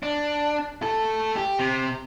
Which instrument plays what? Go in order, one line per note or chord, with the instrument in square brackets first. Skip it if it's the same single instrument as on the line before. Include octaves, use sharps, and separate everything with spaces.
[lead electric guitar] D4
A3 A4
G4
C3